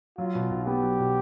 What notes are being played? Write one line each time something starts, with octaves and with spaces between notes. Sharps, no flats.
F#3 F4
B2
B1
B3 G4
F#3
B2